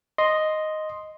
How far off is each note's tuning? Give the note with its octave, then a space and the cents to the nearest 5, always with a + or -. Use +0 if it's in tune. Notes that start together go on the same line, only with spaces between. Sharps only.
D#5 +0 C6 +0